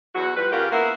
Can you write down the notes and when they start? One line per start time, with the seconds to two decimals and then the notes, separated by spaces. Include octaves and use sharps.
0.15 E2 F#4
0.37 F3 G3 B4
0.52 C#3 F4 G4 A#4 F#5
0.72 A#3 B3 E4 F5 F#5